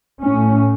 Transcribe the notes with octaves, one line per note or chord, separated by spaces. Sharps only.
A2 C#4